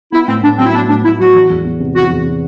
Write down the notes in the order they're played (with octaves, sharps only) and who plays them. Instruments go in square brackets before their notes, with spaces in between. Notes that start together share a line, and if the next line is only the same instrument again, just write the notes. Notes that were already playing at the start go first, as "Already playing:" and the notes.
[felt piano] B3 [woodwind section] E4
[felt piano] A2 [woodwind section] C4
[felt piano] A2 [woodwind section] D4
[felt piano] F#3 [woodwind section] C4
[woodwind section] E4
[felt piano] B3 [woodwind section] D4
[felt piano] A2 [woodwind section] D4
[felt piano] A2 [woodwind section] E4
[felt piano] F#3 [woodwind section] F#4
[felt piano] E3
E2
B3
C3
[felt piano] E3 [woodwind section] F#4
[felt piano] E2
B3